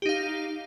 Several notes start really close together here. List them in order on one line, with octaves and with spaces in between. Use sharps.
G4 D#4 F5